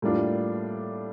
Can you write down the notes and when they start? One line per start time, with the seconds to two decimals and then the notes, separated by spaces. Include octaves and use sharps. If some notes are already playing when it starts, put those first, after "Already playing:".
0.02 A2 G3 A#3 D4 F4